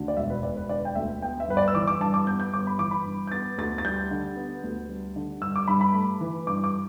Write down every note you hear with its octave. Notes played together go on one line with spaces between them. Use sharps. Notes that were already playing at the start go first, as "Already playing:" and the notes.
Already playing: D2 D3
D5
E1 E5
B4
E1 D5
B4
D3 D5
G5
D2 E5
B3 G5
E5
G1 B4
D5
E6
E3 D6
D6
G2 A5
D6
B3 G6
G6
G1 D6
B5
E3 D6
B5
G2
G6
B3 A6
D2 A6
A6
G3 G6
D3
B3
D2
G3
D3
G2 E6
D6
G2 B5
B5
A3
E3
G2 D6
D6